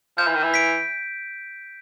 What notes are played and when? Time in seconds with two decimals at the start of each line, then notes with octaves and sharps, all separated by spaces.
0.18 F3 G6
0.27 E3
0.35 D#3
0.43 E3
0.54 B6 D7